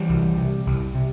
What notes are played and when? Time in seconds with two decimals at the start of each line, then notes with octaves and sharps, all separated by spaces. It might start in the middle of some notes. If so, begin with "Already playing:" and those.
Already playing: E3 G3
0.09 C2
0.38 C3
0.67 C2
0.95 C3